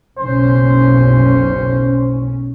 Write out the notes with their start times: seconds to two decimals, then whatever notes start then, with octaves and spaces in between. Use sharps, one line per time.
0.18 F#1 B1 C#4 C5